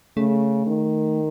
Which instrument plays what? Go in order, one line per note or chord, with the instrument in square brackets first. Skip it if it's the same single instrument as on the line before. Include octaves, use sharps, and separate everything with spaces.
[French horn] C#3 [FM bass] A3
[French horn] D#3